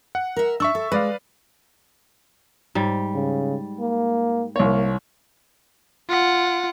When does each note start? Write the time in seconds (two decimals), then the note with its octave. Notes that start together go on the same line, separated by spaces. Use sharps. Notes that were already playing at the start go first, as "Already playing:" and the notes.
0.15 F#5
0.36 A#4 E5
0.60 D4 E5 C#6 E6
0.75 A4
0.92 G#3 B4 D5 F5
2.75 G#2 G3
3.14 C#3
3.80 A#3
4.56 C2 A#3 C#5
6.09 F4 F#5